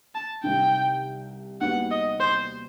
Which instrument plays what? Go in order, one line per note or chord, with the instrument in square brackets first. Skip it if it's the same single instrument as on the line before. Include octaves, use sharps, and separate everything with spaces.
[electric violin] A5
[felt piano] C2 C3 D#3 [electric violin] G5
[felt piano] D#2 D#3 G3 B3 F#4 [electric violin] F#5
[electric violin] D#5
C5